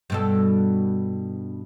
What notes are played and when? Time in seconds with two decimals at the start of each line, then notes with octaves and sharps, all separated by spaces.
0.10 G2 B2 A4